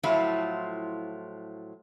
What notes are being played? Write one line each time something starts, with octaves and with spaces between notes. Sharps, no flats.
A2 F3 F#3 E4 F4